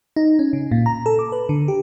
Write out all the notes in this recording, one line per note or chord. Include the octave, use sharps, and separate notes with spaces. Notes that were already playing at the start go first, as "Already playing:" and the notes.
D#4
C#4
C#3
A#2
A#5
A4
D6
B4
D3
G4